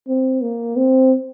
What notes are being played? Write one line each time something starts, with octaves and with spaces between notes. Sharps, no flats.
C4
A#3
C4